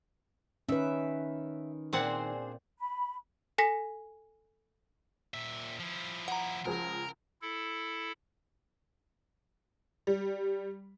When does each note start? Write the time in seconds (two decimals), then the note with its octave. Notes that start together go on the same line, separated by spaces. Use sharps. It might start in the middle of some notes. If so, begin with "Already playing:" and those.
0.69 D#3 C#4 B4 E5
1.93 A#2 C4 D4 G#4 C5 F#5
2.79 B5
3.58 A4 G#5 A#6 B6
5.34 A#2 E5
5.80 F3 E4
6.28 F#5 A#5
6.65 C#2 F3 G#4 A#4
7.42 E4 A4
10.07 G3